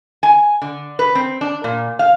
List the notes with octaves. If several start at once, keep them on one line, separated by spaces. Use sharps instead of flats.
G#5
D3
B4
C4
D4
A#2
F5